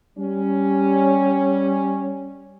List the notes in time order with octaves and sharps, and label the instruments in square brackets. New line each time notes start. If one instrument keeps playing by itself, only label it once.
[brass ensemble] G3 C#4